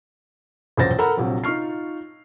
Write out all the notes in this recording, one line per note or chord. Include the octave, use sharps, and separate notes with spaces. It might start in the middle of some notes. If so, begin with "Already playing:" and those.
E1 A#1 F#2 C5 A6 A#6
A4 A#4 F#5 A#5 B5
A#1 C3 F#3
D#4 F4 C#6 F6 C7